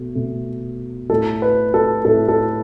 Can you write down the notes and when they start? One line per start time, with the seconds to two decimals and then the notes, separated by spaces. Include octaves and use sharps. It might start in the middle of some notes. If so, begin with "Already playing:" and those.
Already playing: B2 A3
0.15 B2 A3
1.10 A2 A3 A4
1.42 B4
1.74 A4
2.05 A2 A3 A4
2.28 A4